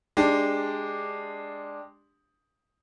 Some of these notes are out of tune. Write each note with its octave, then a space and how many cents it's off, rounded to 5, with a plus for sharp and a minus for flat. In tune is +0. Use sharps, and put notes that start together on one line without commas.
G#3 +0 D4 +0 G4 +15